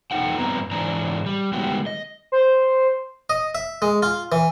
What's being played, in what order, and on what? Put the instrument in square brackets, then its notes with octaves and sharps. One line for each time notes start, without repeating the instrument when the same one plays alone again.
[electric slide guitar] E2 E3 A3 D#4 F#5 G5
G2 B3 C4 A#5
G#2 E3 D4 A#5
G3
D#3 G3 G#3 B3 F#4 G4
D#5
[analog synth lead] C5
[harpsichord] D#5
E5
G#3
F4
E3